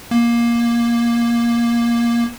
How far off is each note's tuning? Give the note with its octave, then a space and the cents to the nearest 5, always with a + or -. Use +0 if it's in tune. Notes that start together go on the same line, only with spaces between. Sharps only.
A#3 +15